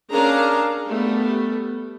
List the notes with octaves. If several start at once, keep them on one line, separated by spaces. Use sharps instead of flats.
C#4 D4 G#4 A#4 F5 A#5
G3 A3 B3